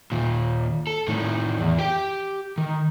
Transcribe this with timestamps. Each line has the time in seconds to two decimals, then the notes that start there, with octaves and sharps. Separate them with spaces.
0.12 D#2 A#2
0.87 A4
1.08 A2 D#3
1.58 E2
1.79 G4 G5
2.58 D#3